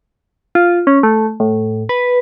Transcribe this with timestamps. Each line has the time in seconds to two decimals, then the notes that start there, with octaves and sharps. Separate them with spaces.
0.55 F4
0.87 C#4
1.03 A3
1.40 A2
1.89 B4